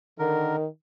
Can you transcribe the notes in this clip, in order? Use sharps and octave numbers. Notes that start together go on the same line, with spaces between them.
D3 D#3 A#4